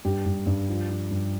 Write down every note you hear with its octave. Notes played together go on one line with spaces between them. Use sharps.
G2 G4
G2
G2
F3
F3
G2